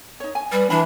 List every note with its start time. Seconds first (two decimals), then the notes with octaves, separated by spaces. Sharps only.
0.20 D#4 C#5
0.35 G#5
0.52 G3 B4
0.70 E3 D4 B5